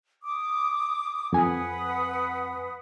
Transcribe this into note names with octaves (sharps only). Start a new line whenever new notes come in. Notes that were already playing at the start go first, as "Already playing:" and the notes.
D6 D#6
F2 B4 F#5 G#5 D#6